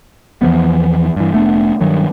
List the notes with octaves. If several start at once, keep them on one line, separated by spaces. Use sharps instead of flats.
E2 E3 F3 B3
G2 E3
F1 A3 B3 D4
G2 D#3 F#3